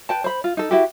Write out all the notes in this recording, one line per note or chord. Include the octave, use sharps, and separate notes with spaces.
B4 G5 A5
C5 B5
F4
D#4 A4
E4 F#4 G4